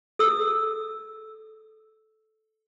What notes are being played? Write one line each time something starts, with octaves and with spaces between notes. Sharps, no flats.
A4 E6